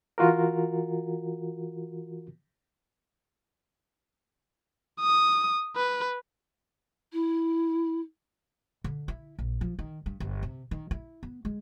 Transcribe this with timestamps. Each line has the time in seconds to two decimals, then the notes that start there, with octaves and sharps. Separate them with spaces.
0.18 E3 F4 F#4 A#4
5.01 D#6
5.76 B4
7.12 E4
8.84 D3
9.08 E4
9.39 A#1
9.61 F3
9.79 D#3
10.06 G2
10.20 G1
10.43 C3
10.71 D#3
10.91 E4
11.23 B3
11.45 G#3